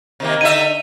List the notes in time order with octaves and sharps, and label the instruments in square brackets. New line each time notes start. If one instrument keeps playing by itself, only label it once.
[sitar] C3 D#3 A#3
[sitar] D3 D#4 E5 [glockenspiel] D#7